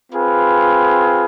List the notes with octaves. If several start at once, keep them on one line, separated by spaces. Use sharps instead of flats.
C4 F4 G#4 B4